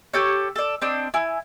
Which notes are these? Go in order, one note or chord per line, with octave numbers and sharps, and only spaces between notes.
G4 A4 C#5
A4 D5
C4 D4 D#5
E4 G#5